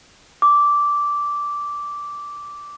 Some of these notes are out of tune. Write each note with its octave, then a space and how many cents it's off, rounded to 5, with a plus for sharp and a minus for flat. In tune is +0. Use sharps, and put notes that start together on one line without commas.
D6 -10